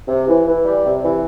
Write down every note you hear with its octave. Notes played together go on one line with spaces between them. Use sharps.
C3
E3
E3
G3
C3
E3